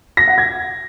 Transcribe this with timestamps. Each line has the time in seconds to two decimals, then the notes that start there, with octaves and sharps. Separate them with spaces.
0.17 A#6
0.28 F#5
0.38 G#6